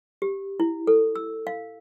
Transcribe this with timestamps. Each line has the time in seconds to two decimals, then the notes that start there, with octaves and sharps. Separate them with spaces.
0.22 G4
0.60 E4
0.87 A4
1.15 E6
1.47 F5